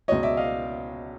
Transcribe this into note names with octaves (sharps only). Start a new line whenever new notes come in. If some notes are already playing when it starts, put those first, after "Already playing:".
C#2 B2 F#3 C#5 D#5
D5 E5
D#5 F5